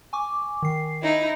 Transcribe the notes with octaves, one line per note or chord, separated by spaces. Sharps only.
G#5 C#6 D6
D#3 C7
D#4 E4